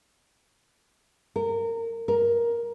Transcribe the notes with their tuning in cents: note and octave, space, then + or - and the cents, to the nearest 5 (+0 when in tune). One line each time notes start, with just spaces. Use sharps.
A#4 -25
A#4 +10